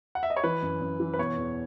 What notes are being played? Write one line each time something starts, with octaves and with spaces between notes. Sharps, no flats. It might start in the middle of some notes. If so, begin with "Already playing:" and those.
F#5
E5
D#5
C#5
E3 B4
F#2
F#2
E3
B4
B2 C#5
E2